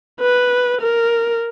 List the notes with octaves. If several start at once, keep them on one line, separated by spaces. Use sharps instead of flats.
B4
A#4